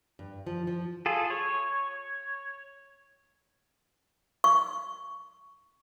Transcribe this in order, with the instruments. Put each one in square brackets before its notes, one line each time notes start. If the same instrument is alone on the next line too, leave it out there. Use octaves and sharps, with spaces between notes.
[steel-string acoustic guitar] G2
F3
F3
[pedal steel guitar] F4 G#4 A4
C#5
[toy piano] C#6